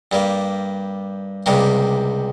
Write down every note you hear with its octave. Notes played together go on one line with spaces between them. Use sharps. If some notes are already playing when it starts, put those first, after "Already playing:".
G2 G3 A#3
C#2 C3 G3 A#3